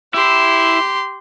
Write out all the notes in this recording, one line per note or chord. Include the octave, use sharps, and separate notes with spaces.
E4 G4 C6